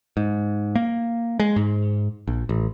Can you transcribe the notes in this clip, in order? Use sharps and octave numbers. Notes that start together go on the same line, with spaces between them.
G#2
A#3
G#3
G#2
A#1
A1